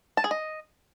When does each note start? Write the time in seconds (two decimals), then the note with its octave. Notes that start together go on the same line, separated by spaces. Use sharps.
0.17 A5
0.24 G#4
0.31 D#5